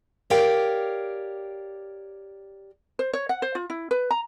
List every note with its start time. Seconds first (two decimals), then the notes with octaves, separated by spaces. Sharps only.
0.30 G4 A#4 C#5 D5 F5 G5
2.99 C5
3.13 C#5
3.29 F#5
3.42 C5
3.55 F4
3.70 E4
3.91 B4
4.11 A#5